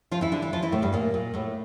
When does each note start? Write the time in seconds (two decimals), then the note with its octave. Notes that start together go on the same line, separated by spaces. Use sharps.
0.11 F3 F4
0.21 E3 E4
0.32 D3 D4
0.42 E3 E4
0.53 F3 F4
0.62 E3 E4
0.72 A2 A3
0.82 G2 G3
0.93 A#2 A#3
1.14 A#2 A#3
1.34 A2 A3